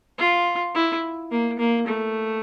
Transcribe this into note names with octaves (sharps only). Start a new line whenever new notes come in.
F4
E4
A#3
A#3
A3